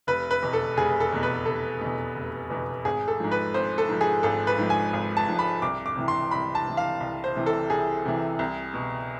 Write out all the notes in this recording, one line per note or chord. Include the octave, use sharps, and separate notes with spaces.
F1 B4
B4
E2 B2
A4
F1 G#4
A4
E2 B2
B4
F1 A4
E2 B2
F1
E2 B2
G#1 G#4
A4
G#2 F3
B4
G#1 C5
A4
G#2 F3
G#4
G#1 A4
B4
G#2 F3
G#5
G#1
A5
G#2 F3
B5
C2 D6
D6
C3 E3
C6
C2 B5
A5
C3 E3
F5
C2
C5
C3 E3
A4
C2 G#4
C3 E3
C2
B2